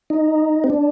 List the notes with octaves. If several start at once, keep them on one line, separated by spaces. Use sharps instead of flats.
D#4
C4
D4